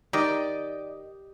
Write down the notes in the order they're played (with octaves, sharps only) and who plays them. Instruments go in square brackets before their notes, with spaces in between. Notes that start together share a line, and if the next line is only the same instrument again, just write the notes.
[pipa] D#3 [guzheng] G4 D#5 [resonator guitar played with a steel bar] D5